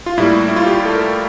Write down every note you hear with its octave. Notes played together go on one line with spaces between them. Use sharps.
F4
A2 G3 A#3 E4
E4
F4
G4
F4
A4
A#4